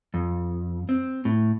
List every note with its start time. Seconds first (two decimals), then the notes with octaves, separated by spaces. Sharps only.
0.14 F2
0.89 C4
1.25 A2